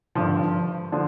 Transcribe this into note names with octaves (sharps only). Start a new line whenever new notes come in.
G#1 G2 D3 F3
D3 F3 D4